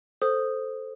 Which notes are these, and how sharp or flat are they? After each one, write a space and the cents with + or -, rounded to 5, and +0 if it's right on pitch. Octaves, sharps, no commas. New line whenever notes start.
A4 +0 C5 +0 D#6 -5